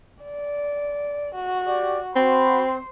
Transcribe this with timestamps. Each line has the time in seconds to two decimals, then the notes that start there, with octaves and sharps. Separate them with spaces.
0.23 D5
1.35 F#4
1.67 G4 D5
2.16 C4 F#4 C5 B5